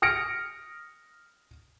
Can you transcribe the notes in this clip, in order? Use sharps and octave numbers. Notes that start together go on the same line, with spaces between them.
D#6 F6 A#6 C#7 D7